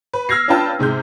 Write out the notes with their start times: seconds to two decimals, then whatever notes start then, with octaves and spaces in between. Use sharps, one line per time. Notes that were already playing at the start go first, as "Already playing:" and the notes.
0.13 B4
0.29 E6 F6 G#6 A#6 C7
0.48 C#4 D4 F4 B4 G5 A5
0.79 G#2 C3 G#3 G6